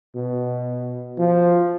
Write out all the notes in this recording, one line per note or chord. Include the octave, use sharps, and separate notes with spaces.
B2
F3